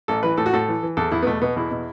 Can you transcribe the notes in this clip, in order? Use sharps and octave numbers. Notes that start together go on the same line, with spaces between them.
A1 A4
E3 B4
A2 A4
F#4
A2 A4
E3
E3
E2 A4
E2 E4
B3
B2 A3
B2 B3
E2 E4
B2